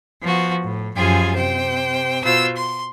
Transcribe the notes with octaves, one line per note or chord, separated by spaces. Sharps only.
F3 B3 F#4
A2
F#2 F3 F4 G4 G#4 G#5
C3 C5 G5
B2 F4 F#4 C5 E6
C6